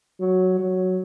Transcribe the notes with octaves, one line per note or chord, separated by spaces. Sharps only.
F#3
F#3